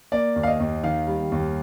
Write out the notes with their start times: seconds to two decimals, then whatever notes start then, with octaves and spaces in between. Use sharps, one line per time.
0.12 A#3 D5
0.36 D#2
0.43 F5
0.47 D#5
0.60 D#2
0.83 D#3 F5
1.07 G3
1.32 D#2